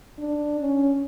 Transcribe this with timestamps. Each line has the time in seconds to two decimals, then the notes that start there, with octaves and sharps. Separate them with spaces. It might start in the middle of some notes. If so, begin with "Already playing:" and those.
0.18 D4
0.60 C#4